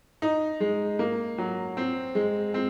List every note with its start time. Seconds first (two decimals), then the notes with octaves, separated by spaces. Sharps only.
0.22 D#4
0.60 G#3
0.99 A#3
1.38 F#3
1.77 C4
2.15 G#3
2.54 C4